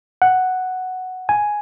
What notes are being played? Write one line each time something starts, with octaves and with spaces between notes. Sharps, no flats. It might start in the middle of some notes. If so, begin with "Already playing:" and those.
F#5
G#5